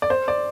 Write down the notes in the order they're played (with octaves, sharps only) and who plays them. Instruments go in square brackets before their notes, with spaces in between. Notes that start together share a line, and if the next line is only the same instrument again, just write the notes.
[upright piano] D5
C5
D5